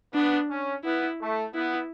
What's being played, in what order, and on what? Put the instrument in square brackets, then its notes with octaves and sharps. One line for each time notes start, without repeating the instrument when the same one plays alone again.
[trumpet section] B3 [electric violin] D4
[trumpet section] C#4
[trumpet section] B3 [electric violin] E4
[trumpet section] A3
[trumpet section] B3 [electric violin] E4